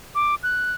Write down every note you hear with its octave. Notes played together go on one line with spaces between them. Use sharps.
D6
F#6